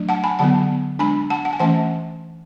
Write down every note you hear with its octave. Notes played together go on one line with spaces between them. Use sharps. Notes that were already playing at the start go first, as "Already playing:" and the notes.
Already playing: F#3 A3 D4
F#5 A5
G#5 B5
D3 F#3 B3 F#5 A5
G#3 D4 G#5 B5
F#5 A5
F#5
G#5
E3 A3 C#4 F#5 A5